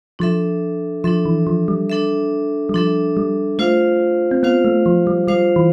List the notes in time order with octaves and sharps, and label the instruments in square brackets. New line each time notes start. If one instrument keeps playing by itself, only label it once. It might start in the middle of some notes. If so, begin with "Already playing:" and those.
[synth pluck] F3 [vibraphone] D4 A4 E5
[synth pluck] F3 [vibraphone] D4 A4 E5
[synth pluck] E3
F3
G3
[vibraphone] D4 A4 E5
[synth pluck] G3
[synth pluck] F3 [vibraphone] D4 A4 E5
[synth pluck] G3
[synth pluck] A3 [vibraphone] F4 C5 F5
[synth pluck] C4
[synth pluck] B3 [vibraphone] F4 C5 F5
[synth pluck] A3
F3
G3
[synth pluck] G3 [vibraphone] F4 C5 F5
[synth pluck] E3